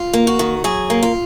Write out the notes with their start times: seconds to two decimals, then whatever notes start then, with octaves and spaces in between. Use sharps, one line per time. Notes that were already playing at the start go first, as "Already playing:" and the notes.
Already playing: F4
0.13 A#3
0.27 F#4
0.39 D#3
0.64 F#3 G#4
0.90 A#3
1.03 F4